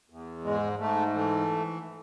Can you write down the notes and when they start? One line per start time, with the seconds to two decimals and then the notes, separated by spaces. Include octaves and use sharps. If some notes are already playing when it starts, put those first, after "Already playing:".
0.10 E2
0.44 G#2 G#3
0.79 G#2 A3
1.14 E3 A3